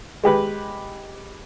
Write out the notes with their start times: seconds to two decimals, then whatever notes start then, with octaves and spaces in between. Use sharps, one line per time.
0.24 G#3 G4 B4